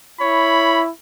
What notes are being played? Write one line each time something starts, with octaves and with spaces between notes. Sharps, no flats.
E4 C#5 B5